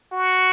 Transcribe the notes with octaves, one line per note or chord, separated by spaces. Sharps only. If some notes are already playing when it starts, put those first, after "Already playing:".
F#4